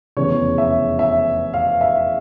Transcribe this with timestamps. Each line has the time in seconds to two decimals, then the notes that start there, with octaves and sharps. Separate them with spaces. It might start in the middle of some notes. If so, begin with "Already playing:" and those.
0.17 F1 E2 C#3 C#5
0.58 E5
0.99 E5
1.54 F5
1.81 E5